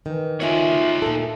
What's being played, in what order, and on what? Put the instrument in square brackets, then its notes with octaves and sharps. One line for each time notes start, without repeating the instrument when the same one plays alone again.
[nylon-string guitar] D#3 [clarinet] E3
[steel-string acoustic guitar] D2 E5 G#5 [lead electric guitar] D#4 C#5 [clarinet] F4
[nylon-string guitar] A#2 A4